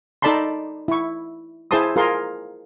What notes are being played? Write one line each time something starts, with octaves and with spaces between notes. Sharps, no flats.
D#4 A4 D5 A5 B5 C6
E4 C#6
E4 G#4 C5 A5 C6 D#6
F4 G#4 A#4 C6